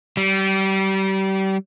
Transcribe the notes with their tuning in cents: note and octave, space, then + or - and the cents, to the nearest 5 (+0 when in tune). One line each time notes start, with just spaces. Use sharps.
G3 -30